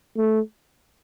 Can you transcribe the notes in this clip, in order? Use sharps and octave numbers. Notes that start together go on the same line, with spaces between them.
A3